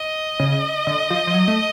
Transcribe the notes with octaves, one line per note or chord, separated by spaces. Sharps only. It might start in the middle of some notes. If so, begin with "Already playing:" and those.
Already playing: D#5
C#3
D3
F3
F3
F#3
A3